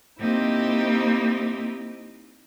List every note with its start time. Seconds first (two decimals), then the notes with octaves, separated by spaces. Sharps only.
0.19 A#3 C4 D#4 E4 G4 C5